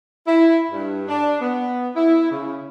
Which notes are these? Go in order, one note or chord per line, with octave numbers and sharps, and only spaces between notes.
E4
G2
D4
B3
E4
C#3